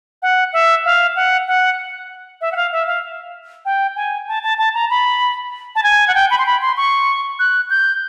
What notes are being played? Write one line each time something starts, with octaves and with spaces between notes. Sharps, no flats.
F#5
E5
F5
F#5
F#5
E5
F#5
F5
E5
F5
G5
G#5
A5
A5
A5
A#5
B5
A5
G#5
F#5
G5
B5
C6
B5
C6
C#6
F#6
G6